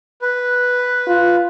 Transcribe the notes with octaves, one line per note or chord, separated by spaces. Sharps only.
B4
F4